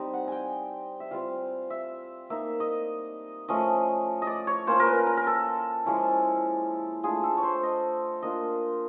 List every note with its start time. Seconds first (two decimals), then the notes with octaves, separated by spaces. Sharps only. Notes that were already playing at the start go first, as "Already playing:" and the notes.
Already playing: G3 C4 D#4
0.13 F#5
0.28 G5 G#5
1.00 E5
1.11 G3 C4 F4 F5
1.70 E5
2.30 A#3 D#4 E5
2.60 D#5
3.48 F3 A3 C#4 D#5
4.22 D#5
4.27 D5
4.47 C#5
4.67 A#3 C#4 F4 C5
4.80 A#4
4.87 B4
5.07 A#4
5.17 A#4
5.27 A4
5.85 F3 G#3 C#4 E4
7.03 A3 D4 F4 G#4
7.23 A4
7.37 C#5
7.43 C5
7.63 D#5
8.22 A#3 D4 F4 D#5